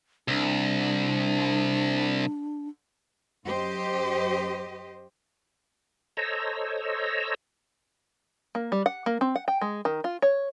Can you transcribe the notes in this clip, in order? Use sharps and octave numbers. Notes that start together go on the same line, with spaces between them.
C2 D4
F#2 G4 C5 D#5
A4 C5 C#5 D#5 A#5 E6
A#3
G3
F#5
A#3
C4
F#5
G5
G#3
D#3
F4
C#5